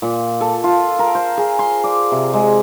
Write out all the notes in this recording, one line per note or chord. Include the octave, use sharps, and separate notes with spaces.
A#2
A4
F4
A#4
C5
G#4
C6
D5
C3
G#3